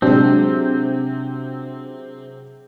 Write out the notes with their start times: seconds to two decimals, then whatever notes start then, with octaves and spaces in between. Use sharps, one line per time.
0.02 C3 F#3 G#3 C4 D4